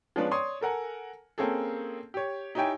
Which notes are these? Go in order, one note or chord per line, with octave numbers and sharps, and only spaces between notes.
F3 G#3 B3 C#4 D4 B4
C#5 D5 C6 D#6
A4 A#4 F#5 G#5
A#3 C4 C#4 G#4 A4
G4 C#5
D#4 E4 G4 C#5 G5 G#5